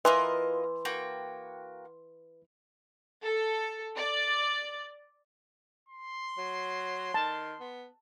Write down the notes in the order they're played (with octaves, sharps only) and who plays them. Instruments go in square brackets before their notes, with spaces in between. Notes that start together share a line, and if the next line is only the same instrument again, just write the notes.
[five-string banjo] E3 [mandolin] F4 A#4 D#5 [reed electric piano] B4 [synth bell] C6
[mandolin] A#3 F#4 G5
[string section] A4
D5
[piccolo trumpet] C6
[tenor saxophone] F#3
[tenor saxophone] D#3 [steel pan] A5
[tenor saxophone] B3